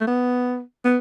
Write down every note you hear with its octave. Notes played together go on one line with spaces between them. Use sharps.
A3
B3
B3